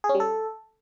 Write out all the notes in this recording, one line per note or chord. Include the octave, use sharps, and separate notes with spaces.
G#4
C#4
G3
A4